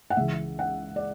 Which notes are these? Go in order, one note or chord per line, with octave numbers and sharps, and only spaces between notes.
F#5
C#2 C#3 E3 E5
F#5
D5